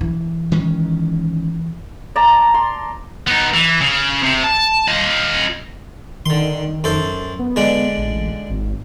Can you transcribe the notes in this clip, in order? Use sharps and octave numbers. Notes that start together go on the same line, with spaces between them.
E3
D#3 G#3 C#4
D5 A5 A#5
C6
B3 D#4
E3
C#3
C3
A5
F4 D#5
D3 D#3 C6
F#2 A4 C5
B3
D3 G#3 D4
A1
G#1